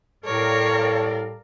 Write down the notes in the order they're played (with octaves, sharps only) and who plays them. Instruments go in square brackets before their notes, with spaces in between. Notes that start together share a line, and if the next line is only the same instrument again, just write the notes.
[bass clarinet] A2 [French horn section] G3 A4 [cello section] A#4 D5 F5 [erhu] C#5